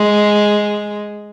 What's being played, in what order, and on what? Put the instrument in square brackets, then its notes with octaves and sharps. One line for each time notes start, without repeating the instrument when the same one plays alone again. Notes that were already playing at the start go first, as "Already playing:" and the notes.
Already playing: [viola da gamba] G#3